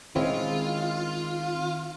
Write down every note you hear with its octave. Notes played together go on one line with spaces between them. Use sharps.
D#3 G#3 C4 C#4 E4 F4